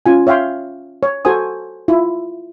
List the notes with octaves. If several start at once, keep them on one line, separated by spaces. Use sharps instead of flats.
C#4 F4 G#5
C#5 E5 F5 G5 C6
C#5
F#4 A4 C5 G#5 D#6
E4 F4